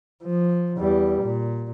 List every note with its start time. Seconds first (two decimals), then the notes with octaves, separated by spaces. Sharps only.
0.24 F3
0.77 E2 G3
1.23 A#2